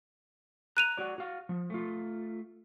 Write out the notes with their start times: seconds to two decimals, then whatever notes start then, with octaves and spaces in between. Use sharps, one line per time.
0.77 A#5 F#6 D#7 F7
0.97 F#4 C#5 D5
1.18 F#4 F5
1.49 F3
1.70 A3 F4